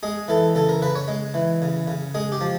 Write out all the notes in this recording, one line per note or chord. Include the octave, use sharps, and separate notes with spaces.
G#3 G#4
E3 A4
C#3 A4
A#4
C#3 B4
C#5
G#3
E3
C#3
C#3
G#3 G#4
G4
F3